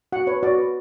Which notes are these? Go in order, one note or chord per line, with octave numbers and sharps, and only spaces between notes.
F#4 F#5
B4 C#5
F#4 D5
B4